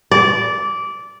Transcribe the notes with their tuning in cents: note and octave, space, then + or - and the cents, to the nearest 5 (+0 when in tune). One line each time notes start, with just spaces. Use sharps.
D5 -15